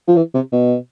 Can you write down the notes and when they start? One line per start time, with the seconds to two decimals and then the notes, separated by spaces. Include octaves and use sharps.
0.08 F3
0.16 E3
0.34 C3
0.52 B2